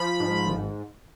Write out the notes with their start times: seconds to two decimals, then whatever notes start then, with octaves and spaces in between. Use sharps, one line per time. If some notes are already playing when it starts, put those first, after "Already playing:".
Already playing: F3 B5
0.20 G#2
0.46 G#1